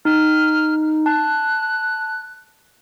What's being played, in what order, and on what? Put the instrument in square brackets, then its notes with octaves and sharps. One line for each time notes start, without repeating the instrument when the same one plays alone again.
[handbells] D#4 [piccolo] F6
[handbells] A5 [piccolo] F#6